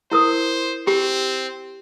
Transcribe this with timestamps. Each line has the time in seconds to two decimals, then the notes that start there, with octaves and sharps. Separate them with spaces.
0.11 E4 A#4 C5 D#6
0.87 C4 G4